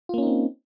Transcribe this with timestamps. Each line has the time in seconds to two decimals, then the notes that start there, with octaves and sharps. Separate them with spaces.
0.09 F4
0.14 A#3
0.18 C#4
0.22 D#4
0.27 C4